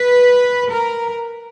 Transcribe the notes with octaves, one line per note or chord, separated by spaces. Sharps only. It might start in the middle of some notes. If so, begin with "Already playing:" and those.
Already playing: B4
A#4